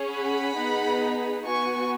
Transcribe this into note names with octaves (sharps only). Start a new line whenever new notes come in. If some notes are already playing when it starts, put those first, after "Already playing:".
Already playing: C#4 G#4
F#5 B5
B3 D#4 G#4
B3 F#4 G#5 C#6